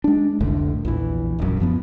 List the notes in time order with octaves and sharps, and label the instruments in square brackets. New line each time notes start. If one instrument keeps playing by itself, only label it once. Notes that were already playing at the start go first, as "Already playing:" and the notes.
[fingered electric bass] G#3 D4
F1 C2 A2 D3
A#1 E2 E3
D1 A#1 F#2
F#2 F3 B3